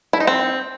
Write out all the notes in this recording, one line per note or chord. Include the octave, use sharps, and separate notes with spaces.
E4
D#4
C4